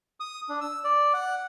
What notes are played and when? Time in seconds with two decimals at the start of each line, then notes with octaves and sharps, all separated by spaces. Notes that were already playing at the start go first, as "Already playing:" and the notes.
0.20 D#6
0.49 D4
0.61 E6
0.84 D5
1.14 F#5